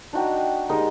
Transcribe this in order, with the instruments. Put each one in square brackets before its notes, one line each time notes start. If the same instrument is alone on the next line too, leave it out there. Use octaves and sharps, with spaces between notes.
[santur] D4 D#4 F#4 G5
G#3 D#4 G4 A#4